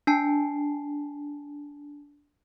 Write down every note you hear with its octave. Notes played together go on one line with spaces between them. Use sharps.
D4 G#5 A5 C7